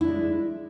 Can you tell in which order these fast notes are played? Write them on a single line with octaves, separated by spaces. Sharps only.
E4 D4 G#3